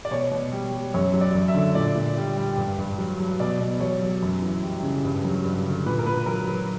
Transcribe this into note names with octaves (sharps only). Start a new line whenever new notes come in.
D5
B2 C#5
B2
G3
G3
F#2 C#5
F#3
D5
F#2
E5
D3
A#2 D5
A#2
G3
G3
G2
G2
F#3
F#3
B2 D5
B2
F#3 C#5
F#3
F#2
E3
G3
C#3
G2
F#3
G2
D3
A#2 B4
A#4
A#2 B4
F#3 A#4
F#3 B4